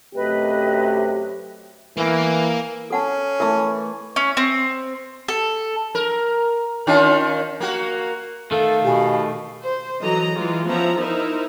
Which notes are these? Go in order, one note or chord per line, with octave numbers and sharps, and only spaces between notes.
F#2 C3 A3 G4 B4 D#5
E3 A#3
C#4 A4 F#5 A5
E3 A3 A#4 E5
C#4
C4
A4
A#4
D#3 C#4 F4
A#3 F#4
D#3 A3 A4 F5
B2 G4 G#5
C5
E3 F#3 A4 D#5 A#5
E3 G#3 F4
F3 B3 C#4 E5 A#5
D#4 E4 A#4 C5 E5